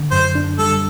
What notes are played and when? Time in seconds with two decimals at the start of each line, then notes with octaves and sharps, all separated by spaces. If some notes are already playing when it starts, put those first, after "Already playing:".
Already playing: D3
0.11 F#2 C5
0.35 D4
0.58 G3 A4